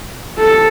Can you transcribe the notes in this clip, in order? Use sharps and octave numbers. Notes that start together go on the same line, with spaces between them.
A4